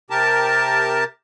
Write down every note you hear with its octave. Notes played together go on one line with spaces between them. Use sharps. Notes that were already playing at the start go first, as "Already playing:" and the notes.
C3 G4 A#4 A5